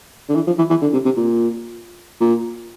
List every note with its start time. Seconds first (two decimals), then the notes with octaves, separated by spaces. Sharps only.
0.29 D3
0.35 E3
0.47 F3
0.58 E3
0.70 E3
0.81 D3
0.93 C3
1.05 C3
1.17 A#2
2.20 A#2